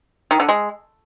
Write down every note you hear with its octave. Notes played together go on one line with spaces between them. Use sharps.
D#3
D3
G#3